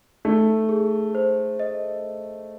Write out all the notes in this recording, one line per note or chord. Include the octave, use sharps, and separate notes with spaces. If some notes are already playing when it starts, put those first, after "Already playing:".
A3 D#4
G#4
C5
D#5